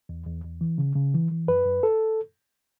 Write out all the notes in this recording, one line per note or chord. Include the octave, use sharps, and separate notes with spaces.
E2
E2
E2
E3
C#3
C#3
E3
E3
F#2 B4
F#2
A4